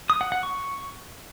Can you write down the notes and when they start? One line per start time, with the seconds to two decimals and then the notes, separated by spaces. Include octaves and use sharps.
0.10 D#6
0.21 F#5
0.32 F#5
0.43 C#6